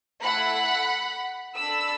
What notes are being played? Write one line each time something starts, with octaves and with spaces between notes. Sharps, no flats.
A3 E4 A4 F#5 B5
D4 A4 B5 E6